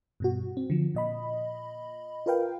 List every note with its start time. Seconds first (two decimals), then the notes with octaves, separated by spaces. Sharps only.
0.20 G2 B2 F#4
0.57 C4
0.70 D3 F3
0.95 A#2 D#5 B5
2.26 F4 A#4 B4 F5 G5